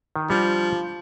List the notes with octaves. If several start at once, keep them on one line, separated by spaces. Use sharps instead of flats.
D#3
F3 G3 D4 A#5